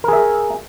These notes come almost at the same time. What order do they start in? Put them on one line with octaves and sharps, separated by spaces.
A#4 G#4 E5